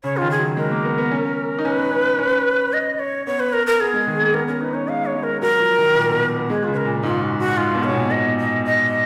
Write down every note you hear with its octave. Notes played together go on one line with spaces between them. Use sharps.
C#3 C#5
D#3 F4
G#4
F#3
G#3 A#4
A#3
B3
B3
C#4
D#4
C#4 B4
C#4
C#4
D#5
C#5
B3 C#5
B4
A#4
A#4
B3 G#4
G#3
D#3
A#3
B3 A#4
C#4 A#4
D#4 B4
D#4
C#4 C#5
G#3 F5
C#5
G#3
A#4
F#3 A#4
F3
D#3
A#2
B2
B3
G#3 G#4
C#3 F4
B4
A#4
A#2
G#2 F4
F#4
F#4
G#2 F4
B2
C#5
B2
A#2
B2 D#5
D#5
D#5